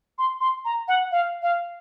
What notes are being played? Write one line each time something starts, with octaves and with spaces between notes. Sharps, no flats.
C6
C6
A#5
F#5
F5
F5